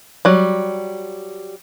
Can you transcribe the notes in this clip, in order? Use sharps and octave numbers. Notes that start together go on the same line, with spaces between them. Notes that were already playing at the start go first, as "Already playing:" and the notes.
F#3 G3